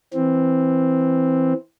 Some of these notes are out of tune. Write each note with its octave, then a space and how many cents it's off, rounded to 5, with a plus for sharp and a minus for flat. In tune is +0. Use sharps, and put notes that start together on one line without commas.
E3 +0 C4 +0